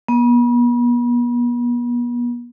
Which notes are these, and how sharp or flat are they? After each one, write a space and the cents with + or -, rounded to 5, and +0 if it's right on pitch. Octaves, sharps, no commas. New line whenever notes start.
B3 -40